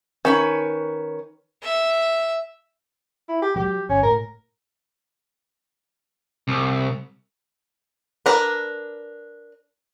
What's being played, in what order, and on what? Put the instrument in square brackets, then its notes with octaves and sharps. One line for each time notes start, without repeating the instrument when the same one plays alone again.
[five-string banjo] D#3 [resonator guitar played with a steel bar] C#4 B4 C#5
[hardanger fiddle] E5
[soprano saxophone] E4
G4
[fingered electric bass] F#3 G3 [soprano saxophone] G4
[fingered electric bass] G1 [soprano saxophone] C#4
[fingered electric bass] A2 [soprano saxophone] A#4
[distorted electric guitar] C2
[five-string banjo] D4 A#4 B4